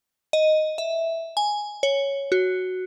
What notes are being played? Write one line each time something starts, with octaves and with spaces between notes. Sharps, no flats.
D#5
E5
G#5
C#5
F#4